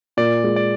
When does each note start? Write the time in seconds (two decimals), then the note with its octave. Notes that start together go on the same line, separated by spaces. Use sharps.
0.17 A#2 D5
0.44 G#3
0.56 D5